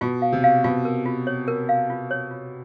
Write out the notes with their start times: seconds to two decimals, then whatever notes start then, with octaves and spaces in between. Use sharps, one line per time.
0.01 B2 F4
0.22 F5
0.32 C3
0.44 F5
0.64 B2 F4
0.85 A#4
1.06 F4
1.27 C#5
1.48 A#4
1.69 F5
1.90 F4
2.11 C#5
2.31 F4